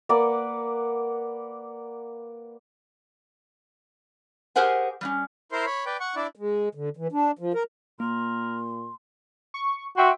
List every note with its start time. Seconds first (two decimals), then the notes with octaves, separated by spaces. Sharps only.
0.09 A#3 B4 D5 F#5
4.56 G4 G#4 A#4 C5 F#5 G#5
5.01 G3 B3 C#4
5.52 E4 A#4 C5 C6
5.66 C#5 B5
5.86 B4 D5 G5
6.00 F#5 C#6
6.16 D4 E4 D5
6.35 G#3
6.75 D3
6.97 E3
7.12 D4
7.39 F3
7.54 A#4
8.00 A#2 A#3 A#4 C6
9.54 C#6
9.97 F#4 E5 G5 C6